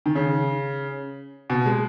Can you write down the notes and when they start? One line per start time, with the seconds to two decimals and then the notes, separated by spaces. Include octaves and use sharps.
0.06 D#3
0.15 C#3
1.50 B2
1.66 G#3